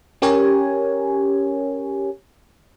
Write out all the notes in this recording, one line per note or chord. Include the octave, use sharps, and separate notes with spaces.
C#4 G4 A#4 C#5 G#5